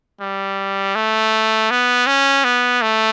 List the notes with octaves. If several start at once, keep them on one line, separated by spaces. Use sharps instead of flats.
G3
A3
B3
C#4
B3
A3